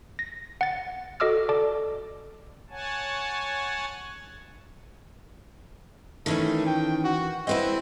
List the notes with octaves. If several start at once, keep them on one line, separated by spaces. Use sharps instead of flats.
A#6
F#5 A6
F#4 A4 D#5 D6 E6 F6
A4 D5 A5 D6
C#5 F#5 G#5 A5
D#3 E3 A3 C#4
G5
F#4
C4 E4 B4 D#5